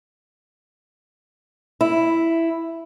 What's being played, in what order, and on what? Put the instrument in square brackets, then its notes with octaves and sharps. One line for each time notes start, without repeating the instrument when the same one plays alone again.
[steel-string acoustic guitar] E4